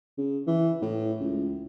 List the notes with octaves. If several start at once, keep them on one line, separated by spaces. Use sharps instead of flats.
C#3
E3
A2
C#2